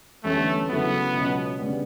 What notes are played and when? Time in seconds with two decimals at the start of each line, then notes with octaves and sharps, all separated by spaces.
0.24 E2 D3 G3 A3 C#4 E4
0.69 C#3 F#3 A3 B3 E4
1.13 C#2 B2 F#3 C#4
1.59 C#3 G3 B3 D4